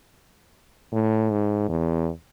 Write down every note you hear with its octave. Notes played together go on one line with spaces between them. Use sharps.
A2
G#2
E2